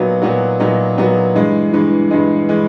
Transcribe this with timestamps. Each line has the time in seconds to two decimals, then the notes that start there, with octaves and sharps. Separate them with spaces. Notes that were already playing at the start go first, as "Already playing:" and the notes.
Already playing: A#2 F#3 B3 D#4 F#4
0.22 A#2 F#3 B3 D#4 F#4
0.60 A#2 F#3 B3 D#4 F#4
0.98 A#2 F#3 B3 D#4 F#4
1.35 G2 E3 G#3
1.73 G2 E3 G#3
2.11 G2 E3 G#3
2.49 E3 G#3